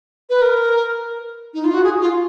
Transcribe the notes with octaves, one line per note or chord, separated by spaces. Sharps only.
B4
A#4
D#4
F4
F#4
G#4
F4